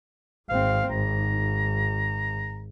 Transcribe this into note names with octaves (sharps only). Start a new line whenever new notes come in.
G#1 C4 F5
G#1 A#5